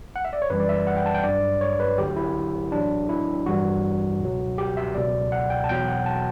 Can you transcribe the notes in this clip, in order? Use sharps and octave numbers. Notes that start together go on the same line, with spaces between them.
F#5
E5
D5
C#5
F#2 E3 G3 B4
D5
E5
F#5
G5
A5
G5
A1 G2 F#3 D5
C#5
B4
D2 D3 F#3 G4
E4
A1 A2 F#3 D4
E4
A1 G2 E3 G3 F#4
C#2 B2 F#3
G4
E5
C#2 B2 F#3 D5
F#5
G5
A5
E2 B2 F#3 G5
F#5
A5